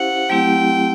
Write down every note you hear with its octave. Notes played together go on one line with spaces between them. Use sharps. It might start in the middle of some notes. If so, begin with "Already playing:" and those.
Already playing: C#4 E4 G4 C5 F5 F#5
F#3 A3 C4 E4 G4 G5